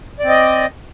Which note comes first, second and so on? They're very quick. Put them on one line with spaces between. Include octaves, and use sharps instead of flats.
D5 C4 D#5